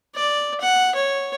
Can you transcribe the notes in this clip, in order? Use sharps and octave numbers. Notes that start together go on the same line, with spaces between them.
D5
F#5
C#5